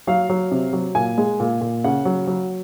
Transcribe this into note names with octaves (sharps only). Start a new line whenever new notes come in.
F#3 F5
F#3
C3
F#3
A#2 G#5
G#3
A#2
A#2
C#3 F#5
F#3
F#3